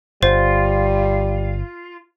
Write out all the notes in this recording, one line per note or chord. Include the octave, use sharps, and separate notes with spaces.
G1 G3 F4 C5